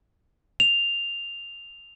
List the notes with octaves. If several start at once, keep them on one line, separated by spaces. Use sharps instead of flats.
F7